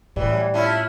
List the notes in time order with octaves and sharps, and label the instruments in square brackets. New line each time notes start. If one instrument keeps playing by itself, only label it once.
[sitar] F#2 E3 [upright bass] A2 [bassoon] G3
[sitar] C#4 D4 F4 [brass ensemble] E4